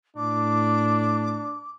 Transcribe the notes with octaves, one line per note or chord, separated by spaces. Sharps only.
A2 D4 D6